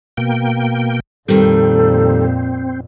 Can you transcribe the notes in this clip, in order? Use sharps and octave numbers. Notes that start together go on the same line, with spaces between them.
B2 A#3 G5
F2 A#2 D#3 G3 C4 A4